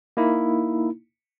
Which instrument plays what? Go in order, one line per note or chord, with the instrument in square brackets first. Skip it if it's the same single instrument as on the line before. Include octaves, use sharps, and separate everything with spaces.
[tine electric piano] A#3 D#4 E4